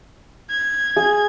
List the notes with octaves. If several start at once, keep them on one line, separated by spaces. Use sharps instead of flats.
G#6
G#4